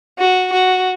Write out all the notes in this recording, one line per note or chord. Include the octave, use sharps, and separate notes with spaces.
F#4
F#4